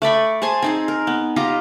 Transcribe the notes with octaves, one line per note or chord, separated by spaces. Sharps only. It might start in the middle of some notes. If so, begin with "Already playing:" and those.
A3 D5 B5 C#6
G#4 C5 G#5 A5
C4 D#4 G#4
A#4
B3
F4 G4 D#5 A#5